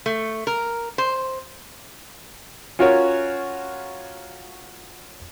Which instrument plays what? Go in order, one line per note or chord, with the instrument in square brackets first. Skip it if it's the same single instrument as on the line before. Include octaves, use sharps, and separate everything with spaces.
[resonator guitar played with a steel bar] A3
A#4
C5
[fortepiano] C#4 F4 F#4 A#4 C#5